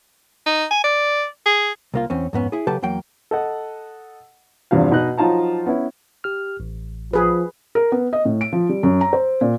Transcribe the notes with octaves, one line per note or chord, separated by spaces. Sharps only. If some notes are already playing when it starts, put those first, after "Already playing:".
D#4
G#5
D5
G#4
C2 A#3 F4
E2 C4 C#4
F2 G#2 B3 C#4
E4 G#4
C#3 F#3 G4 A4 B4 A5
E2 F#3 A#3 G5
A4 D#5 F#5
E2 G2 C3 F3 F5
B2 D#4 D#5 F#6
F3 F#3 D#4 F4 A5 A#5
B3 C#4 E4
G4 F6
A1
F3 G#4 B4
A#4
B3
D#5
A2
D7
F3
G3
F#2
A#5
C5
A#2